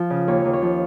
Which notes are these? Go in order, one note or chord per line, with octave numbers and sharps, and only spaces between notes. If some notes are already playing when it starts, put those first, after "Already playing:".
Already playing: F3
C#3
D#2 C#5
D#2
C#5
F3